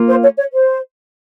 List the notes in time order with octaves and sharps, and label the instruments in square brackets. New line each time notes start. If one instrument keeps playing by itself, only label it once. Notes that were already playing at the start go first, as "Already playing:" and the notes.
Already playing: [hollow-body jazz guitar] A#3 F4
[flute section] C5
C#5
C#5
C5